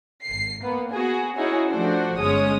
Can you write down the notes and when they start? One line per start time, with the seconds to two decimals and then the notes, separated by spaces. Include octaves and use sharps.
0.25 G#1 C7
0.61 A#3 B3
0.92 B3 F#4 G#4
1.37 C#4 D#4 E4 F#4 G#4 C#5
1.68 F3 A3 D4 F#4 C5
2.19 G1 G#3 C#4 C#5 D#6